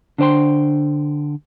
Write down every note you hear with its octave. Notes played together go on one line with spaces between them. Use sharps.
D3 D4 C5 G5 C6